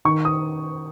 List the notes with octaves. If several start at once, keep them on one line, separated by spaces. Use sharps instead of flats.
D#3 C#6
D#6